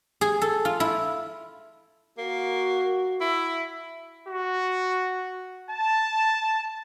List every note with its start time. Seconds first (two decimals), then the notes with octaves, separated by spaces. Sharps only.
0.21 G#4
0.42 A4
0.65 F4
0.80 E4
2.18 A#3 F#4
3.21 E4
4.27 F#4
5.68 A5